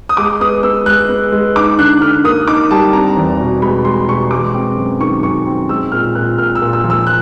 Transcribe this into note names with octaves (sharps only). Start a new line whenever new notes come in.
D#6
G#3 D6
B3 D#6
B3 E6
G#3 F#6
B3
G#3
D#4 D6
D3 F#6
D3 F6
A#3 D#6
D#4 D6
G3 A5
C4 A#5
E2
B2
G#3 B5
G#3 C6
B2 C#6
G#3 D6
C4
F#2
D#3 C#6
F#2 C#6
C4
G#3 E6
A#2 F6
A#2 F#6
A#2 F6
E6
A#2
E6
F3
E6
F#6